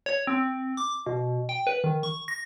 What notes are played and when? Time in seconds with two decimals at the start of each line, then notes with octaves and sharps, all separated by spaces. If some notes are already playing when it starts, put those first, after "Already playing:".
0.06 C#5
0.27 C4
0.77 D6
1.06 B2
1.49 G5
1.67 B4
1.84 D#3
2.03 C#6
2.28 A#6